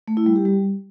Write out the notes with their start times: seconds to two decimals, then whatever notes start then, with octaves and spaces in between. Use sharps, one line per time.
0.08 A3
0.17 E4
0.26 G3
0.36 G4
0.45 G3